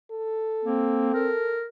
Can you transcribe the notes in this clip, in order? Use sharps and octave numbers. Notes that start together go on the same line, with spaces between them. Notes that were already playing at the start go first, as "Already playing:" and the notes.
A4
A#3 C4
A#4